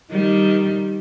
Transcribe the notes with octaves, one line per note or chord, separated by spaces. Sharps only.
D#3 G3